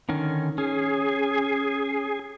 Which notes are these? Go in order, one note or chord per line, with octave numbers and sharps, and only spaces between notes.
D3 D#3 C#4
C#4 G#4